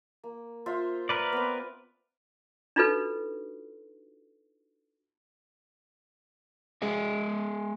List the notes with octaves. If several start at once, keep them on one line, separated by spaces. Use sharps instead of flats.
A#3
F4 C5 E5
A#4 B4 D5
B3 C4
D4 D#4 F4 F#4 A4 B4
G#3 G#4 D#5 E5